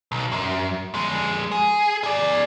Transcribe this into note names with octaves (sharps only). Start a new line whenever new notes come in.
B1
F#2
F2 G#3
G#4
G#4 D5